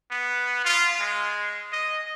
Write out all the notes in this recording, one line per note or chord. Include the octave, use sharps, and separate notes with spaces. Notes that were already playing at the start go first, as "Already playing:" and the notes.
B3
F4
G#3
D#5